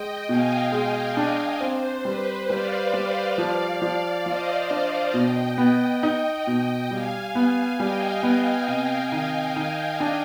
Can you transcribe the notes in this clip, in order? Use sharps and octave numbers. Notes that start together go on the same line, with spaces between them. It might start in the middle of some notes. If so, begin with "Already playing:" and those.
Already playing: G#3 D#5 G5
B2 F5 G#5
G#3 F5 G#5
F5 G#5
D4
D#5 G5
C4 C5
G3 B4
G3 D5 F5
G3
F3
F3
F3 C5 D#5
D4 C5
B2 D#5 G5
B3
D#4
B2
G3 F5 G#5
B3
G3 D#5 G5
B3
C3
D#3
D#3
D4